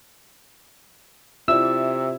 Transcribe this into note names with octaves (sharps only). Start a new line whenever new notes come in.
C3 E4 F4 D5 E5 E6